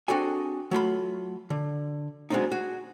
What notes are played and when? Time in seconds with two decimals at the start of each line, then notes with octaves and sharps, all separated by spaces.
0.08 C4 D4 F#4 G#4 A4 G#5
0.71 F#3 A3 F4 B5
1.50 D3
2.30 F#3 G#3 B3 C4 D4 D#4
2.51 F#4 G#4